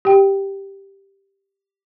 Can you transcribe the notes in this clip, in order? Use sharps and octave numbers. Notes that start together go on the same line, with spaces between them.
G4 G5